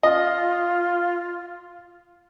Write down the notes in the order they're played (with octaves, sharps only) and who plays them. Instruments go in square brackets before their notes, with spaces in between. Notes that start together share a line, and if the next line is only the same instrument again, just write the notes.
[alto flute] F4 [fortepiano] D#5